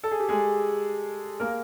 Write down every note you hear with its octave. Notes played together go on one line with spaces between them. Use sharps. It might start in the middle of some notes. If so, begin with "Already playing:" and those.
A4
G#4
G4
G#3 G#4
A#3 A#4